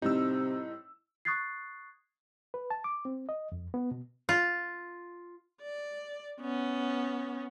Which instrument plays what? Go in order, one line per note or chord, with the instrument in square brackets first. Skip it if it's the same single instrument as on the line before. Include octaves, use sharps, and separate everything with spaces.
[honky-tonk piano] A2 G3 C4 [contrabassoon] C3 [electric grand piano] D#4 E6
[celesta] C#6 D#6 F#6 G#6 A6 C7
[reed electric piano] B4
A5
D6
C4
D#5
F2
B3
B2
[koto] F4
[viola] D5
B3 C#4